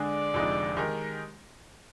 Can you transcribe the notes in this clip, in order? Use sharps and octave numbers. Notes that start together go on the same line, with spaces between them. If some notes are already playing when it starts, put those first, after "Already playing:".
Already playing: D3 G#3 D4 G#4 D5
F1 F2 D3 G#3 D#4
D#3 G#3 D#4 G4 A#4